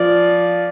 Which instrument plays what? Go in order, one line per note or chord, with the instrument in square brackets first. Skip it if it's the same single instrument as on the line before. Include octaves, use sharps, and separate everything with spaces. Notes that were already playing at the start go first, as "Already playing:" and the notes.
Already playing: [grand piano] F3 [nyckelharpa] D5